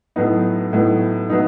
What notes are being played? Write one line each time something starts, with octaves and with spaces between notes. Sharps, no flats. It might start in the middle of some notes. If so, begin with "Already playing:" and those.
A2 F#3 B3 D#4
A2 F#3 B3 D#4
F#3 B3 D#4